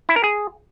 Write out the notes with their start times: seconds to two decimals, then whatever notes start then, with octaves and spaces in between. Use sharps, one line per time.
0.09 E4
0.16 A#4
0.24 G#4